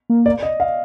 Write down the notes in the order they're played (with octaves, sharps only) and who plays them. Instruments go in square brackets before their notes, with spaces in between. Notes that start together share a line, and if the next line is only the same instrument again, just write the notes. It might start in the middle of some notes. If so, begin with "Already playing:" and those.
[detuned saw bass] A#3
[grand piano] D5
D#5
F5